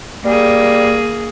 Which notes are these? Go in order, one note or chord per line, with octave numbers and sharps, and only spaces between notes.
G3 A#3 G#4